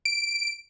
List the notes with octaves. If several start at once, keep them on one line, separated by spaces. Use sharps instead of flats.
D7